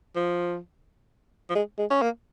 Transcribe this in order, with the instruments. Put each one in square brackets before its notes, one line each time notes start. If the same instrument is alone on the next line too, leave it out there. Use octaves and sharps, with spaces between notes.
[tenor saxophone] F3
F3
G#3
G#3
C#4
A#3